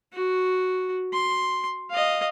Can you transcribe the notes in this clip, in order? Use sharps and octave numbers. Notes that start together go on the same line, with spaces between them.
F#4
C6
D#5 F5